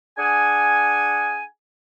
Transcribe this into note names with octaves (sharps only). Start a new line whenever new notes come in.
D4 G#4 F#5 G#5